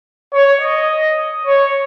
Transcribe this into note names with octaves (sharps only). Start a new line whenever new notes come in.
C#5
D#5
C#5